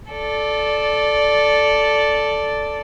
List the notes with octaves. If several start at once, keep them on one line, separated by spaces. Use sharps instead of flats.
A4 D5